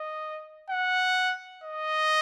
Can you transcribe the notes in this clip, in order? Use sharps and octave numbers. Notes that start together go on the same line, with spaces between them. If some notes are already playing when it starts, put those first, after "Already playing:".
Already playing: D#5
F#5
D#5